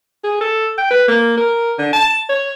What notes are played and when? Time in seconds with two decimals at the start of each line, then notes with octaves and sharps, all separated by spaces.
0.24 G#4
0.41 A4
0.78 G5
0.90 B4
1.08 A#3
1.37 A#4
1.79 D3
1.93 A5
2.29 C#5